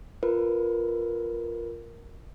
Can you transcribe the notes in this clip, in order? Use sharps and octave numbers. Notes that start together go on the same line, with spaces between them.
F4 A#4 B4